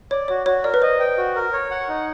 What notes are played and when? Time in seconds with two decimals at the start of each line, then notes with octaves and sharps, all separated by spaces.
0.11 C#5 D5
0.28 F#4 C#5
0.46 F#4 C#5
0.64 A#4 D5
0.74 B4
0.82 C5 D#5
1.00 G5
1.18 F#4
1.36 A#4
1.53 C#5
1.71 F#5
1.89 D#4